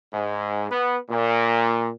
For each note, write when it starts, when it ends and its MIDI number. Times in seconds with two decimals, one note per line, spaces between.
0.13 0.68 44
0.71 0.99 59
1.10 1.90 46